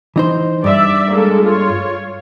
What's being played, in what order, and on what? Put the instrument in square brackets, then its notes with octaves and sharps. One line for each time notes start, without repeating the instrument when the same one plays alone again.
[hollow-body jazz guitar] E3 D#4 C5
[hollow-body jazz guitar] G2 [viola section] D5 E5
[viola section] G#3 A#3 A4
F4 C#5